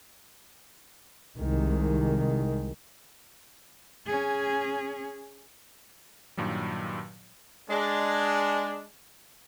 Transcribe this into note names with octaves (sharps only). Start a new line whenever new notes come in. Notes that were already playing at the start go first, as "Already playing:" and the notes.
C2 D#3 G#3
C#4 G#4
G2 A#2 D#3 F#3
G#3 D4